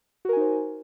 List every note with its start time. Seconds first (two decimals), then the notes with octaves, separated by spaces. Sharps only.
0.25 F#4
0.29 A#4
0.33 G#5
0.37 D#4
0.41 C5